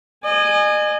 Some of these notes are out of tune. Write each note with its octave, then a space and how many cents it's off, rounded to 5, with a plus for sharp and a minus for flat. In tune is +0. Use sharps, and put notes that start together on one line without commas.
D#5 -40 G#5 +0